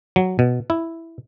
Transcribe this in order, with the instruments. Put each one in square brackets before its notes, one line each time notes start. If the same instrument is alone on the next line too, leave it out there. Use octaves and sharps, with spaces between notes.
[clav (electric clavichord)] F#3
B2
E4